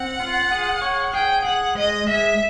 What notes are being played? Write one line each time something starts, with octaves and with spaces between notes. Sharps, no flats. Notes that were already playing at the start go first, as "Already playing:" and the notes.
Already playing: C4 F#5
F4
G#4
C#5
G#4 G5
G#4 F#5
G#3 D#5
G#3 E5